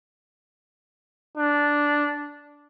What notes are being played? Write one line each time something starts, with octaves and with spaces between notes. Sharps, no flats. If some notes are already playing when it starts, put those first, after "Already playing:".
D4